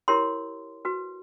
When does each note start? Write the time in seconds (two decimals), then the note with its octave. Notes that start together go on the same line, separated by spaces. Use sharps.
0.08 E4 G4 A#4 C#5 C6
0.85 F#4 B4